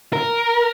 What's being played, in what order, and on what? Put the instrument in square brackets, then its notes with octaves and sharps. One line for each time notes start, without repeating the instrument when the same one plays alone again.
[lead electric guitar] A#4